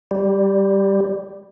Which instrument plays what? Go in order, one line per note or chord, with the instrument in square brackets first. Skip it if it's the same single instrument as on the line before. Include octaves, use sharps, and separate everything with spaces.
[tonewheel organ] G3